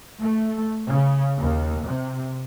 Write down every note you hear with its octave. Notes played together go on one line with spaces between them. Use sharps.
A3
C#3
D#2
C3